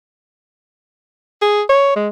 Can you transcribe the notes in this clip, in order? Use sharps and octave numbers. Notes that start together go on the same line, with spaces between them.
G#4
C#5
G#3